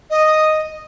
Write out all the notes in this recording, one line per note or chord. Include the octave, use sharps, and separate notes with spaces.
D#5